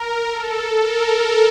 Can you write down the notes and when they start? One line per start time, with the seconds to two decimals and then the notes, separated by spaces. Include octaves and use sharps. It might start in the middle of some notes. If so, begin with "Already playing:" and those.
Already playing: A#4
0.30 A4
0.82 A#4